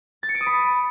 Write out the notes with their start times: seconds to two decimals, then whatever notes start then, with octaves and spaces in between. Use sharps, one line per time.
0.23 A6
0.29 C#7
0.35 D7
0.41 D#6
0.47 B5